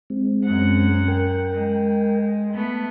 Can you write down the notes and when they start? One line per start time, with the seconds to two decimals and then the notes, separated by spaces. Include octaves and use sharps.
0.10 G#3 C4
0.45 F#2 F#5
1.08 A#4 G5
1.52 G#3
2.53 A3 B3